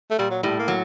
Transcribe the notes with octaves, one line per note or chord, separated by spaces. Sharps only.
A3
A#2 G3
F#3
A2 G3
A#3
F#3